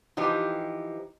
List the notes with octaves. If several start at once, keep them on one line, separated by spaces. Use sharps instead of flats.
E3 F3 D#4 G4